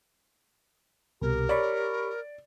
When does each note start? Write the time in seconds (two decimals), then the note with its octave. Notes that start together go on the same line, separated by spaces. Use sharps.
1.22 C2 B2 G4 A#4
1.49 C#5 D5 B5 C#6